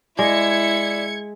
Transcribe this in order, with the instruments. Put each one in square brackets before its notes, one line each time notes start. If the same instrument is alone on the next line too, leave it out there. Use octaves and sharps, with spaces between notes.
[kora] G#3 [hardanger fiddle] E4 [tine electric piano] D5 [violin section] G#6 C#7